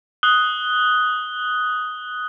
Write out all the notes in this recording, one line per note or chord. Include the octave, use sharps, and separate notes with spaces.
D#6 F#6 G7